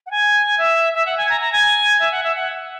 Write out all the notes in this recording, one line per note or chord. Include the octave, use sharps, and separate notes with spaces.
F#5
G#5
E5
E5
F#5
G#5
A#5
A#5
G#5
E5
F#5
E5
F#5